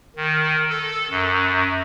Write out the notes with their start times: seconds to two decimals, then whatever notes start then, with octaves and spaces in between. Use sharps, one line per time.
0.16 D#3
0.69 A4
1.11 F#2